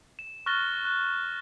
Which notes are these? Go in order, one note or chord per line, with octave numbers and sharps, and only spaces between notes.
E7
C#6 F6 F#6 A6 A#6 G7
F#6